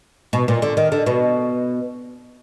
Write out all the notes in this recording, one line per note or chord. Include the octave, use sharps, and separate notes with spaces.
B2
A#2
D3
D#3
D3
B2